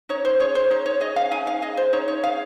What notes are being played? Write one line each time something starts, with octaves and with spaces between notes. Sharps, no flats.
D#4 C#5
C5
G#4 C#5
C5
D#4 C#5
C#5
G#4 D#5
F5
D#4 G#5
F5
G#4 D#5
C5
D#4 C#5
C#5
G#4 F5